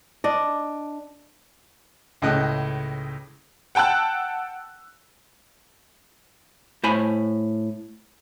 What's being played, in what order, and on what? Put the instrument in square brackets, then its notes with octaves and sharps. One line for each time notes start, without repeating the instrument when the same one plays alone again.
[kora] D4 D#5
[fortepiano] C#2 A2 C#3 D#5 G5 F#6
[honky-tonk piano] F#5 G5 A5 E6 F#6
[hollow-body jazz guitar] A2 C5 G#5 B5